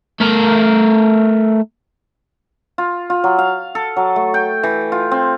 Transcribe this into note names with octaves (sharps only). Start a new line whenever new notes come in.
A3 A#4
F4
F4
F#3
F5
A4
F#3
A3
G5
E3
F4
C4